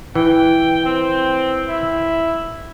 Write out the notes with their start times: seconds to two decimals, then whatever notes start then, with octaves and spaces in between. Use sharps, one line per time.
0.15 E3 G5
0.85 C4
1.68 E4